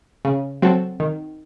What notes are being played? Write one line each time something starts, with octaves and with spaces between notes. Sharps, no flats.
C#3
F#3 C4 F#4 A4
D#3